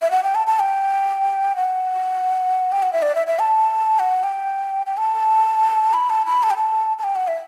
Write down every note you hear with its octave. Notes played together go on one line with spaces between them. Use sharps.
E5
F#5
G5
A5
A5
G5
F#5
G5
F#5
E5
D5
E5
E5
A5
F#5
G5
G5
A5
B5
A5
B5
A5
G5
A5
A5
G5
F#5
E5